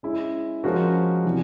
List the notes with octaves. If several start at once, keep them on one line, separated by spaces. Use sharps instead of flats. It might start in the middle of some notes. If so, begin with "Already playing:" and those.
G#3 C#4 E4
F3 G#3 C#4 F#4 A#4
C3 E3 G3